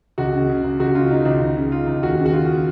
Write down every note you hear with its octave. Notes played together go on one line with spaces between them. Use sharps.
C#2 F#4
C#3
C#3
C#2
C#2 F#4
C#3 F4
C#3 D#4
C#2
C#2
C#3
C#3 F4
C#2
D#2 F#4
C#3
F#4
C#3 F4